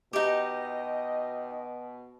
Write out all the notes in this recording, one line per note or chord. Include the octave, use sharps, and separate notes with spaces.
B2 D#4 G4 D#5